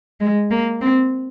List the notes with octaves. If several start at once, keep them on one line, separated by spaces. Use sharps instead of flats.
G#3
A#3
C4